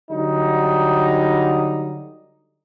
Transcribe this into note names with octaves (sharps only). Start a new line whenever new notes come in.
D3 F#3 G3 D#4